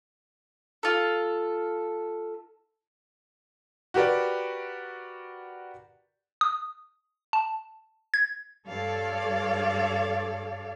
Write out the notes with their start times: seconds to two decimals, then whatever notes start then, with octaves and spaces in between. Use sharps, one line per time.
0.83 F4 A4
3.94 F#4 G4 A#4 B4 D5
6.41 D#6
7.33 A5
8.14 G#6
8.67 G2 A4 C#5 D5 F5